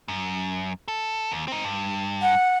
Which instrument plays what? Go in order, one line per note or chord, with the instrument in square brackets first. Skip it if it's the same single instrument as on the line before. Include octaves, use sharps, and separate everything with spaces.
[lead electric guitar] F#2
A4
D#2
C4 D#4
G2
[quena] F#5